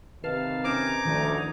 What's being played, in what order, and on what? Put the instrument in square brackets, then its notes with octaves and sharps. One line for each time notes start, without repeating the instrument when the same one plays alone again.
[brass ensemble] C3 D#3 [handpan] B4 [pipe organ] F5 A5 F6
[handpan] C#4 C5 [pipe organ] D#4 G#5 A#5 [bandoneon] D6
[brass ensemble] D2 [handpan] D#3 F3